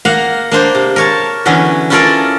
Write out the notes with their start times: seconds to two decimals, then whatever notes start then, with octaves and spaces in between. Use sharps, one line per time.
0.05 A#3 F5 F#5 A#5
0.51 A#3 D4 C5
0.75 C3
0.96 A#4 C#5 A5
1.45 D3 E3 F#3 B3 C#4
1.90 C#4 E4 F4 A4 A#4 D5